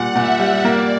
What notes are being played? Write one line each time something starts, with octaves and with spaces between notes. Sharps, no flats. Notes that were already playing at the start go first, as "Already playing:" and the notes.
Already playing: A#2 G3 F#5
A#2 E5
G3
A#3 D5